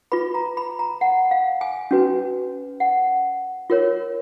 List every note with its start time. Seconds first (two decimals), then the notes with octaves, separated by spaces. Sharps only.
0.12 F4 B4 B5
0.34 A#5
0.57 B5
0.79 A#5
1.01 F#5
1.31 F5
1.61 G#5
1.91 C#4 F#4 B4
2.80 F#5
3.70 F4 A#4 C#5